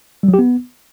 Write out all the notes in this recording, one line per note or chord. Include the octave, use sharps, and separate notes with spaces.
G3
F#3
G4
B3